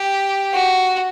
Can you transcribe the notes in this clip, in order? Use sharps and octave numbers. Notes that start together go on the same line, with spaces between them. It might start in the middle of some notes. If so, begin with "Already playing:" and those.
Already playing: G4
F#4